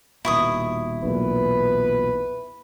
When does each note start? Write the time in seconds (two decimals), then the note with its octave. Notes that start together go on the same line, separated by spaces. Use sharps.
0.25 D#1 B2 E4 C#6 D#6
1.04 B1 E2 A#2 B4